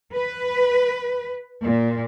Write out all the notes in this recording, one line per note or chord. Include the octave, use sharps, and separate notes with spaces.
B4
A#2